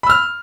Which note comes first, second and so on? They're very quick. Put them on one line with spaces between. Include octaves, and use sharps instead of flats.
B5 E6 F6